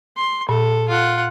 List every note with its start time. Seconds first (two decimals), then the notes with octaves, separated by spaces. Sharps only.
0.17 C6
0.49 A#2 A4
0.89 F4 F#5